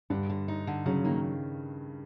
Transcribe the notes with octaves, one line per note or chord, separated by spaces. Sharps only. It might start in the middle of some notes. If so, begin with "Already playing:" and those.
G2 D3
D3
D#4
D3
C#3 F#3
D#3 A#3